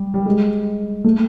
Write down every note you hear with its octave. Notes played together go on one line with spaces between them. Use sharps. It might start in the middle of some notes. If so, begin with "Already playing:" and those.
Already playing: G3
G3
G#3
A3